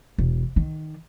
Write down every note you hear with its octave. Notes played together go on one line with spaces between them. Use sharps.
E1
D#3